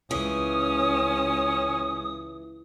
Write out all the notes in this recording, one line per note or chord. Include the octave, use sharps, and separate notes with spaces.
C#2 E3 C#4 D#6